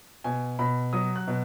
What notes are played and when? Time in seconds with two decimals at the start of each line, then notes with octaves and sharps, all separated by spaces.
0.24 B2 G#5
0.59 B2 B5
0.93 F#3 D#6
1.16 F#6
1.28 B2